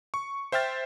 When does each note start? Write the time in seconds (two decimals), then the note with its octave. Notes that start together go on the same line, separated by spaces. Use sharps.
0.14 C#6
0.52 C5 E5 G5 F6 A6